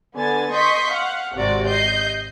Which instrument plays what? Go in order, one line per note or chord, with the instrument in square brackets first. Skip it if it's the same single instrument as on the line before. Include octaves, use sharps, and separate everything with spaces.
[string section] D3 B3 G#5 A6
D#5 C6 C#6 G6 B6
F5 F#5
G#1 C3 F#4 D5
D#5 G6 C7